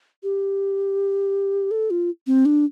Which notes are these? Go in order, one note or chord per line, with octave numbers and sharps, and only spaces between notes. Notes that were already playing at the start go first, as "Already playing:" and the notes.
G4
A4
F4
C4
D4